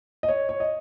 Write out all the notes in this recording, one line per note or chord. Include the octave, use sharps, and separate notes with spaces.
D#5
C#5
C#5
D#5